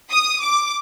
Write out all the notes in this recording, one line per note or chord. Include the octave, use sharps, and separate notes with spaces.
D#6
D6